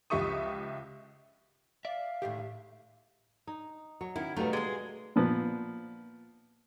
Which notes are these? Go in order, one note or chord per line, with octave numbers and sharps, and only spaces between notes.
C#2 F3 G4 E5 C#6 D#6
D5 E5 F5
A2 D3 D#3 G4
D#4
F#3 C#5
D#3 B3 C#4 E4
B2 D#3 F#3 G3 A3 A#3
G#3 G#4 D5
A#2 F3 B3